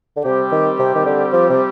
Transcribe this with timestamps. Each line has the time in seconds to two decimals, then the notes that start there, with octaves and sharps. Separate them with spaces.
0.16 D3
0.25 C3 G3 C4 G4
0.52 D#3
0.79 C3
0.95 D#3
1.06 D3
1.33 F3
1.50 C3